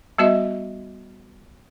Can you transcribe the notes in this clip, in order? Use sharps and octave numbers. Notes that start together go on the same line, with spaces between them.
G3 B3 F#4 D#5 E5